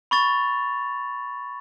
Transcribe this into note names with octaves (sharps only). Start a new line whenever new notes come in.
B5 C#6 A6 F7